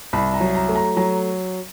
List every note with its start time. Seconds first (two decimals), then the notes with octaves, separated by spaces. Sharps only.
0.13 C2 B5
0.34 A#5
0.40 F#3
0.55 A#5
0.69 A3
0.76 A#5
0.97 F#3 A#5